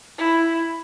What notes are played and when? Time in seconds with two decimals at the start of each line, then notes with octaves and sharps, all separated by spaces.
0.18 E4